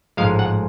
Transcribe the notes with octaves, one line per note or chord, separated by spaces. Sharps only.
A1 G#2 F3 G#3 F5
F#5